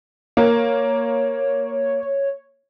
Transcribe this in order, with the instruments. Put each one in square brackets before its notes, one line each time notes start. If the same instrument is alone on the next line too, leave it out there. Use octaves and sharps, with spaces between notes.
[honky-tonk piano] A#3 [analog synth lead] C#5